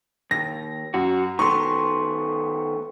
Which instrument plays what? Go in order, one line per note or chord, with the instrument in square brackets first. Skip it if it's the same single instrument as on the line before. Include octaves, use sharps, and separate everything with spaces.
[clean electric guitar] D#2 [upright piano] A#6
[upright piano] F#2 [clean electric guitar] F#4
[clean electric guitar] D#3 A3 B3 [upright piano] C6 C#6